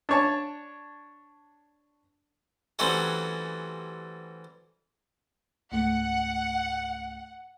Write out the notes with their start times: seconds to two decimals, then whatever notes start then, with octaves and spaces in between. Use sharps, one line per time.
0.09 D4 C#5 A5
2.79 E3 F#3 G3 A3 C4 C#4
5.72 C#2 G#2 A3 F#5